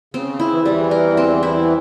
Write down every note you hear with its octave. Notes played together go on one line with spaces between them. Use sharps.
C#3 C4
E4
E3
C#3
E2 E3 G3
A#4
C4
E4